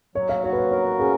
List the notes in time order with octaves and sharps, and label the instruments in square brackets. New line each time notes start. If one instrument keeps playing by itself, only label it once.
[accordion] F#3 [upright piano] C#5
[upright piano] F5
[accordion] F#4 [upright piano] C#5
[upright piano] B4
C#5
[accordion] A#4 [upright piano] C#5
[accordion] C#4 [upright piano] G#4